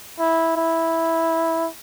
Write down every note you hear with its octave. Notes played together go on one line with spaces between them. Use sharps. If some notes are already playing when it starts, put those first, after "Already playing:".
E4
E4